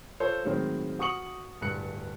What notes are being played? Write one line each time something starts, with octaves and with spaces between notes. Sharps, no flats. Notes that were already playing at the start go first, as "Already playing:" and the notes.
F4 A4 C5 C#5
A2 D#3 F#3 G#3 C4
F#4 C#6 D#6 C#7 F#7
D1 G2 F#6 C#7